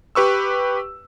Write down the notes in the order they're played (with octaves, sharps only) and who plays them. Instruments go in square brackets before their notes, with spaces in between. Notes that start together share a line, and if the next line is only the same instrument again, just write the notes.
[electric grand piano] G4 B4 C#6 E6